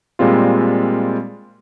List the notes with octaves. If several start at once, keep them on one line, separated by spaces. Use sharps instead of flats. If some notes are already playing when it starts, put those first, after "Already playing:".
A#2 G3 G#3 C4 F4